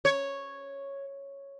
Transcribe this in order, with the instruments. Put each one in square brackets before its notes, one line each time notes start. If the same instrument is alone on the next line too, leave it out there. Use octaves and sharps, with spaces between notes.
[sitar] C#5